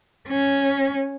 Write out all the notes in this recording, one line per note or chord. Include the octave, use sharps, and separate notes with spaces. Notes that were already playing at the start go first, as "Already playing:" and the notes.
C#4